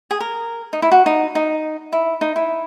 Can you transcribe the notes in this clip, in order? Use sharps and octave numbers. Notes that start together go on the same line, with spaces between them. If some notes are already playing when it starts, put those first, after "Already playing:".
G#4
A#4
D#4
E4
F#4
D#4
D#4
E4
D#4
E4